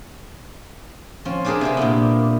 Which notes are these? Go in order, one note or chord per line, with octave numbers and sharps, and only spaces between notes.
F3 C4 C#4
D4 F4 G4 G#4 A#4 B4
C3 E4 G4
A#2 A#3 B3